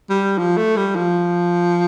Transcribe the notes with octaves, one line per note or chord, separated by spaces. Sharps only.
G3
F3
A3
G3
F3